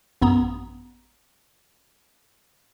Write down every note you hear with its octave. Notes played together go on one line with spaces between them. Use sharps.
A1 F#2 B3 A#5 D#6